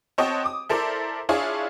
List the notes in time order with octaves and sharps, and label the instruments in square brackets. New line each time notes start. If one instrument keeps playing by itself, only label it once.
[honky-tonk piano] C4 F#4 C#5 D#5 G5 A5
D6 D#6
E4 A4 A#4 C5 D5
D4 E4 F4 G#4 C#5